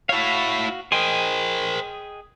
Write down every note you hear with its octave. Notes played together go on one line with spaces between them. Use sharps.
E4 F#4 C#5 F5
G#4 A#4 C5 D#5 G5